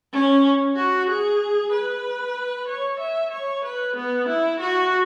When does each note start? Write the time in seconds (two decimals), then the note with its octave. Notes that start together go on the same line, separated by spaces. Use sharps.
0.13 C#4
0.76 F#4
1.08 G#4
1.72 B4
2.68 C#5
3.00 E5
3.31 C#5
3.64 B4
3.96 B3
4.28 E4
4.60 F#4